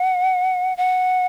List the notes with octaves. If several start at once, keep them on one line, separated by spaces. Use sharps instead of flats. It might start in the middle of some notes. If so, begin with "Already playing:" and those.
Already playing: F#5
F#5